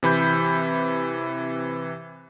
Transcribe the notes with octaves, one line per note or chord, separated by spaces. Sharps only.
C3 E3 B5 G6